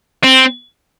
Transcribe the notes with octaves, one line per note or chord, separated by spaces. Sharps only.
C4